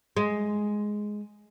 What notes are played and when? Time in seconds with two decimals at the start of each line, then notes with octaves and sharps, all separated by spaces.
0.17 G#3